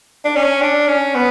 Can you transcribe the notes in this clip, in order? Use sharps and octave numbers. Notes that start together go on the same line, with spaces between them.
D4
C#4
D4
C#4
B3